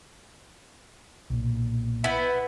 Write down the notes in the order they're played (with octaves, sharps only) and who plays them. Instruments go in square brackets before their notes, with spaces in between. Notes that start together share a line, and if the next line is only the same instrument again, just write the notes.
[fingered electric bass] B1 A#2
[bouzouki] B3 [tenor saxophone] E4